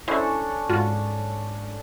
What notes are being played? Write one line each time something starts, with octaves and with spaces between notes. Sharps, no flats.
C#4 D4 E4 A4 C5 D#5
G#2 F4 F#4